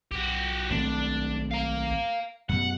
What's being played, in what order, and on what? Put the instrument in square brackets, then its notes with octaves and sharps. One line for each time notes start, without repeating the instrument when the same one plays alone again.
[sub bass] B1 [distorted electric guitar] F#4 G4
[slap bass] G#1 A3 C4 [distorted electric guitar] D4
[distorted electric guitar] F5 A#5
[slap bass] F#2 B2 [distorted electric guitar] F#5